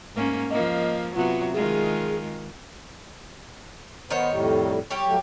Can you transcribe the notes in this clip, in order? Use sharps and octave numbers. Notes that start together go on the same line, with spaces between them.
G#2 A#3 C#4
F3 A#3 D#5
C3 F#3 B3 F4
D#3 G#3 F4 G#4
D#3 B3 D#4 C5 C#5
F2 A2 G3
G3 G4 C#5
F#3 A3